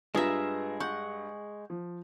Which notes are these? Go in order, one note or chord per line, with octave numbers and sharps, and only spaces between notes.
G2 G#3 F4 G#4 B4 E5 A#5 A#6
F#5 C#6 G6
F3